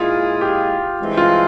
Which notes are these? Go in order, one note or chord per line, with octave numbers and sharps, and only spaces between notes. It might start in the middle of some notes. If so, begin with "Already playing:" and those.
Already playing: A#2 G#3 E4 F4 G#4
G4
G2 E3 G#3 C4
F4